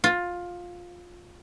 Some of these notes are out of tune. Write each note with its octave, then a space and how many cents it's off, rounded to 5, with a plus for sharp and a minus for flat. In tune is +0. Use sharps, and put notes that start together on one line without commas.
F4 +15